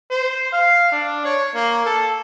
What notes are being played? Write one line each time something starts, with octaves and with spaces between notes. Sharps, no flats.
C5
F5
D4
C#5
A#3
A4